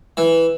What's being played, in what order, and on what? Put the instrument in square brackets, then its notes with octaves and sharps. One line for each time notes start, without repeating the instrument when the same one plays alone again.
[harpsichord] E3